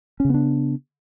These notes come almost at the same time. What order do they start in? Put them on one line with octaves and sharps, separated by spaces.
C#4 C#3 B3 D4